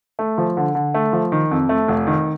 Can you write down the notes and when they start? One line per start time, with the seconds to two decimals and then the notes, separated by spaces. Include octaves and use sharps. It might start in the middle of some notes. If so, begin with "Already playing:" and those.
0.19 A3
0.38 F3
0.57 D3
0.75 D3
0.94 A3
1.13 F3
1.32 D#3
1.51 F2
1.69 A3
1.88 F1
2.07 D#3